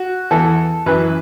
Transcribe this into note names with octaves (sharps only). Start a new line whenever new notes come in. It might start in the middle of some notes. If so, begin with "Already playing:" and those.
Already playing: F#4
E2 E3 A4
F#2 E3 B4